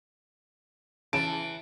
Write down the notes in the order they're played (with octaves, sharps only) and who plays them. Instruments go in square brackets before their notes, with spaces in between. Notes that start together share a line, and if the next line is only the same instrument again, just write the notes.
[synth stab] C#3 A5 [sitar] E3 [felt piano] D7